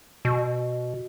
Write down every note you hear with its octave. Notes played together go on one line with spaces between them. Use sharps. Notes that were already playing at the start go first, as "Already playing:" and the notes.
B2